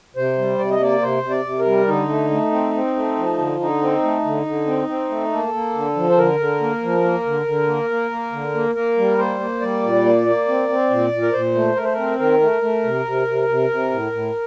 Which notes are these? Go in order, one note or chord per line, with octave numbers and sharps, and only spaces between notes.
C3 C5
G3
C3 D5
D#5
A#3 D5
C3 C5
C3
D5
C3
A#4
G3
D3 D#4
A3
A3
C4
C4
A3
F3
D3
D3 D#4
C4
A3
D3
D3
C4
C4
A3
A#3 A4
A#3
D3
F3
C5
D3 A#4
D3
A#3
F3
A#3
D3
D3
A#3
A#3
A#3
D3
A#3
A#3 A#4
G3
A#3 C5
A#3
G3 D5
A#2
A#3
A#3
C4
C4
A#2
A#2
A#4
A#2 C5
A3
A3 A#4
C5
C4 A#4
D#3 A#4
A3
A3
C3
C3
C3
C3
C3
A2
A2